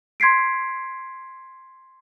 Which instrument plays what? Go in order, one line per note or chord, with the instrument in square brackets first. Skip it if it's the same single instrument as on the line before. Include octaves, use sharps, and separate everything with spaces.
[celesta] C6 G#6 B6 C7 D7